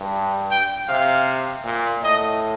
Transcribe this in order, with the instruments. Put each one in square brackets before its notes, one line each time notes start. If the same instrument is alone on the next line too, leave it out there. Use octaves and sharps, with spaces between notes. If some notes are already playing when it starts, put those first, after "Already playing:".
Already playing: [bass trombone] G2
[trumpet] G5
[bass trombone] C3 [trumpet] F5
[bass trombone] A#2
[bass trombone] A2 [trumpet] D#5